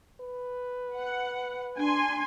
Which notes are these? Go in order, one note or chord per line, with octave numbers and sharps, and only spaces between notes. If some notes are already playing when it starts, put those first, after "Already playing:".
B4
F#5
D4 G#5 C6